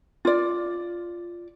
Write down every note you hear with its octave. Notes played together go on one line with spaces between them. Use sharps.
F4 D5